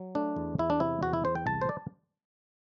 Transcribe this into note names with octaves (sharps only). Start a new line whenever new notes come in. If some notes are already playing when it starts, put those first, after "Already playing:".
Already playing: F#3
A3 D4
E2
E2 E4
D4
C3 E4
E2 F#4
E4
E2 C5
G5
C2 A5
C5
D5